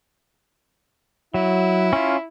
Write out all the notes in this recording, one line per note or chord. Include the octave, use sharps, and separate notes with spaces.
F#3 E4
C#4 F4